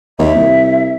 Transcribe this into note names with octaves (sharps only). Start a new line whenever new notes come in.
D#2 E5
C2